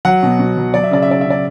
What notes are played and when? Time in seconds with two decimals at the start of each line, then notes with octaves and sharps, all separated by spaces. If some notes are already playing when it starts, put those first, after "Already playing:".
0.05 F#3 F#5
0.23 B2
0.39 B2
0.57 F#3
0.74 F#3 D5
0.84 E5
0.91 C#3 D5
1.02 E5
1.08 C#3 D5
1.21 C#3 E5
1.30 D5